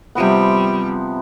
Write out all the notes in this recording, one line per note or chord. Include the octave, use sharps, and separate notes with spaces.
C3 F3 G3 B3